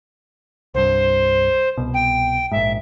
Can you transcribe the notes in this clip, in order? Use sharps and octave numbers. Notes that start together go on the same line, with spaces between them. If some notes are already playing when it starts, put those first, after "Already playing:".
C2 G2 C5
C2 B2
G5
A#1 G#2 E5